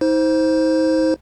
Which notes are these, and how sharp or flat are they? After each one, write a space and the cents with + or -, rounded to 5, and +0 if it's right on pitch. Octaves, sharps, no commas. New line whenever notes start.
D#4 +40 C5 +0